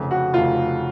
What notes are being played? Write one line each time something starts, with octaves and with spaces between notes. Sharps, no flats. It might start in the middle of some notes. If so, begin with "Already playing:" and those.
Already playing: F1 F2 C#3
F#4
F1 F2 C#3 F4